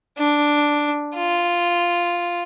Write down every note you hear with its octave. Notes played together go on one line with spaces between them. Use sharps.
D4
F4